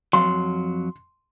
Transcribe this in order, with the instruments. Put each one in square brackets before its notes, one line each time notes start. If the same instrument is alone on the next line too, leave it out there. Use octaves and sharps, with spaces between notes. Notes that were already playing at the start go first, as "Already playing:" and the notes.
[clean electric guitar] F2 F#3 [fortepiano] C6